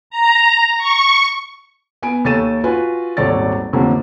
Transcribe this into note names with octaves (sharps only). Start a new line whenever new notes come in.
A#5
C#6
B3 G#5 D7
D#2 A4 C#5 A6 D#7 E7
F4 F#4 B4 G#5
D#1 G#1 A4 C#5 D5 A6
A1 F2 D3 A#3 G4